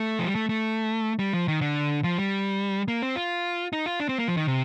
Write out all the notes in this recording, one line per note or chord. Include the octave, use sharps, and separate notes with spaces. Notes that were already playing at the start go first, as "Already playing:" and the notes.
Already playing: A3
F3
G3
A3
A3
G3
F3
D#3
D3
F3
G3
A#3
C4
F4
D#4
F4
D4
C4
A#3
F3
D#3
C3